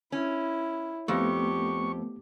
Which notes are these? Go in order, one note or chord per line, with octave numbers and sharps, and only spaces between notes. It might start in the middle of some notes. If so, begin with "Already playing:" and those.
C#4 E4
F2 A3 B3 G4 C#6